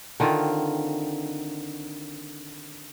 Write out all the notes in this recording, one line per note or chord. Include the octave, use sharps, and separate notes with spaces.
D3 D#3 C4 F4